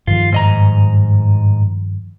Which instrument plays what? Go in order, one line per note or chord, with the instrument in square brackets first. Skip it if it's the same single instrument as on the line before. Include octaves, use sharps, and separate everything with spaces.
[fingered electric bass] G2 D#3 F3 [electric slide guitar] F4
[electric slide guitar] G#2 D#5 A#5